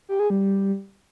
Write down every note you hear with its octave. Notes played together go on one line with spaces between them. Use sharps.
G4
G#4
G3